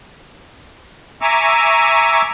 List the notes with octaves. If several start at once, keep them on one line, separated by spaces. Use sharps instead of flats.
E5 G#5 A#5 C#6 D6 E6